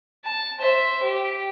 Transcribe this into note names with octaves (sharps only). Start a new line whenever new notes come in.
A5
C5 E5
G4